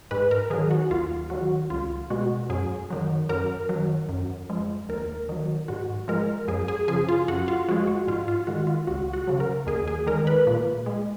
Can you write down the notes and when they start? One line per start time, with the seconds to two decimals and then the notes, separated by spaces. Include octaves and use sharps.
0.11 G#2 B4
0.31 A#4
0.50 D#3 F#3 G#4
0.71 F#4
0.91 D#2 F4
1.30 D#3 F#3 F#4
1.70 C#2 F4
2.10 B2 G#3 F#4
2.50 F#2 G#4
2.90 D#3 F#3
3.29 F#2 A#4
3.69 D#3 F#3
4.09 F#2
4.50 F3 G#3
4.89 D#2 A#4
5.29 D#3 F#3
5.68 G#2 F#4
6.08 F3 G#3 A#4
6.48 F#2 G#4
6.68 G#4
6.88 C#3 F3 G#4
7.08 F4
7.28 F#2 F#4
7.48 F4
7.68 F3 G#3 F#4
7.87 F#4
8.07 G#2 F4
8.28 F4
8.47 D#3 G#3 F#4
8.67 F4
8.87 C#2 F#4
9.13 F#4
9.27 C#3 F#3
9.40 A#4
9.67 D#2 G#4
9.88 G#4
10.06 D#3 G#3 A#4
10.27 B4
10.47 A#2
10.86 G#3